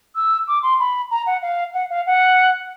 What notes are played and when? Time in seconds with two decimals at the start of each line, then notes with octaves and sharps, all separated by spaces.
0.15 E6
0.47 D6
0.63 C6
0.79 B5
1.11 A#5
1.26 F#5
1.42 F5
1.74 F#5
1.90 F5
2.06 F#5